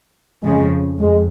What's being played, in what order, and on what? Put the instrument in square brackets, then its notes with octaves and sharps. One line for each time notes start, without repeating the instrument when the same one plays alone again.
[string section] F2 C#3 F3 [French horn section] G#3
[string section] F2 [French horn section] G#3